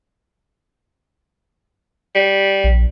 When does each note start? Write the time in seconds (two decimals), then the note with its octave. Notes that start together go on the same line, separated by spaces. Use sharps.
2.15 G3
2.64 A#1